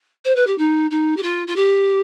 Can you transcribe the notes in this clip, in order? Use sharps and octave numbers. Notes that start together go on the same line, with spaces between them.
C5
B4
G4
D#4
D#4
G4
F4
F4
G4